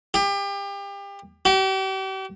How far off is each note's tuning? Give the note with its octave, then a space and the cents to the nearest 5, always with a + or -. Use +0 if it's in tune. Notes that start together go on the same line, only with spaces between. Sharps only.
G4 +30
G4 -40